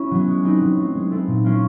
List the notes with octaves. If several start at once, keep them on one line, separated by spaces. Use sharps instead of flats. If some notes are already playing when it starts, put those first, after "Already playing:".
Already playing: C#4 E4
F#3 B3
G#3
C4 D#4 G4 B4
F#3
A3 C4
G#3
C4 E4 A4
A#2
F#3 A#3 C#4 F4